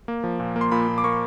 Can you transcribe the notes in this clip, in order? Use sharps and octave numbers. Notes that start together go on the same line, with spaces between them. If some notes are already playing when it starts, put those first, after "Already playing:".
A#3
F3
A#2
A#3
C6
A#2 B5
A#2
D6
A#3 C#6